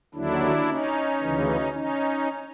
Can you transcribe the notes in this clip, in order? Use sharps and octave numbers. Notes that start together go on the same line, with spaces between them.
D#2 D3 F#3 D4 E4
C#4 D#4
D2 C#3 E3
C#4 D#4